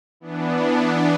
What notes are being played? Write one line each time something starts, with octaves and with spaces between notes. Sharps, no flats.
E3 B3 D4